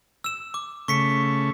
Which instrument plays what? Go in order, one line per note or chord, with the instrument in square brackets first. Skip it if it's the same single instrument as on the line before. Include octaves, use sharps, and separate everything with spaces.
[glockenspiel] E6 E7
D6
[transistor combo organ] C#3 A3 [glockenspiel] C#6 B6 C#7